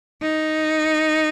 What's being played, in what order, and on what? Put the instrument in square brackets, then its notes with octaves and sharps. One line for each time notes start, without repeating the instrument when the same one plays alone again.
[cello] D#4